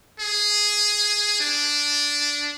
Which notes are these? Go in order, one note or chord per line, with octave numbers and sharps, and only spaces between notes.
G#4
D4